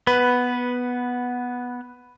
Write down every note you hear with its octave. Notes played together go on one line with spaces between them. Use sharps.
B3 B4